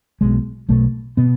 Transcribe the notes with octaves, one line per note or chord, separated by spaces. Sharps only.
B1 B2 G#3
B1 B2 A3
B2 B3